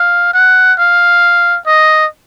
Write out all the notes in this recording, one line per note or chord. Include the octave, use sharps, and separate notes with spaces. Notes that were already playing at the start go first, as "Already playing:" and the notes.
Already playing: F5
F#5
F5
D#5